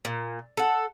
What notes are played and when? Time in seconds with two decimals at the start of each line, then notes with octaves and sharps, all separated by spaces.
0.05 A#2
0.57 A4 F#5